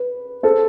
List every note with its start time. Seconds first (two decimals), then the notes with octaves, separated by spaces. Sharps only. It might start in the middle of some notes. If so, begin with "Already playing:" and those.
Already playing: B4
0.43 A4 C5